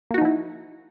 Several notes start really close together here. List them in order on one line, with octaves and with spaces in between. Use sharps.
A#3 F#4 D#4 F3 E4